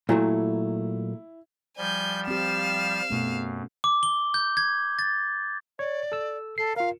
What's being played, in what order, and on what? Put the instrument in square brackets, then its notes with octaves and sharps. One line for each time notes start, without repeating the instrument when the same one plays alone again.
[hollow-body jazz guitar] A#2 F#3 A3 [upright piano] E4
[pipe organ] F3 G3 [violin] G#5 G6
[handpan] C4 G4 [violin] F5 E7
[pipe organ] F#2 [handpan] B2 A3
[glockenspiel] D6
G7
G6
G#6
A6
[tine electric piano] C#5 [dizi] D5
[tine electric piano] A4 E6
[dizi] A4 [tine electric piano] C7
[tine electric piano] F4 A#4 [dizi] F5